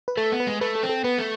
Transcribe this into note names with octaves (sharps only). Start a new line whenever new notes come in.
B4
A3 A4
B3
B4
G#3
A3 B4
A4
C4
A4
B3 B4
A3